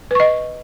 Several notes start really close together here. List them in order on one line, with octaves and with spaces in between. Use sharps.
B4 C#6 D#5